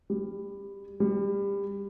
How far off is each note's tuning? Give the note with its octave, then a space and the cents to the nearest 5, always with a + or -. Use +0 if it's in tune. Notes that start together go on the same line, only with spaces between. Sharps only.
G3 +20
G3 +25